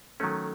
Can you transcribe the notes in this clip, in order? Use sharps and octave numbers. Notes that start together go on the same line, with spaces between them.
D#3 F#3 A3 C#4 A4